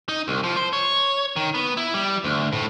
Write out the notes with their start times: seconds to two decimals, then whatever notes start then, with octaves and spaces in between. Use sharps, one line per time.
0.09 D#4
0.28 C2
0.44 F3
0.56 C5
0.73 C#5
1.36 D#3
1.54 B3
1.77 E4
1.94 G3
2.24 D2
2.53 A2